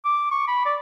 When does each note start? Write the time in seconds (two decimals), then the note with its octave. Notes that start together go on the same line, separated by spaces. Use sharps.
0.05 D6
0.31 C#6
0.47 B5
0.66 D5